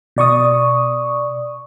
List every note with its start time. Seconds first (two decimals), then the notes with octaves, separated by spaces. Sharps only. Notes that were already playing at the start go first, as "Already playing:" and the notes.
0.16 B2 D5 C#6 D#6